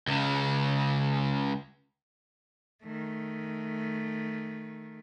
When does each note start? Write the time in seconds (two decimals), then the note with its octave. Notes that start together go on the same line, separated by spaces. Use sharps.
0.07 C#2 C#3
2.83 D#3 A3